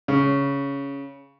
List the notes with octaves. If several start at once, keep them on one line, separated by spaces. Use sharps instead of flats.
C#3